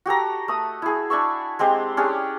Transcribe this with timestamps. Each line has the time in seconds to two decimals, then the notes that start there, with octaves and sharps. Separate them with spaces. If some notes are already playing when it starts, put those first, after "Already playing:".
0.06 F#4 G4 A4 A#5
0.48 A3 D#6
0.82 E4 G#4
1.10 D4 D5 E5 C#6
1.59 G#3 C4 G4 C5
1.97 C#4 D4 G4 G#4